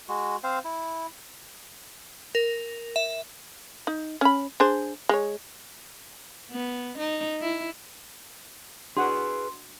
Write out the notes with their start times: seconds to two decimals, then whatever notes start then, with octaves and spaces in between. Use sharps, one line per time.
0.08 G#3 F#4
0.44 C4 C5 F5
0.64 E4
2.35 A#4
2.96 E5
3.87 D#4
4.21 C#4 B5
4.60 D4 G#4 C5
5.09 G#3 C#5
6.51 B3
6.98 D#4
7.41 E4
8.97 D4 F#4 G#4 B4 F#5 C6